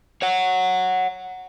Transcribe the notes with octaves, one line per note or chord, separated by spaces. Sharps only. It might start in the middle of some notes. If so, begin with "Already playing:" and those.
C#5 F#5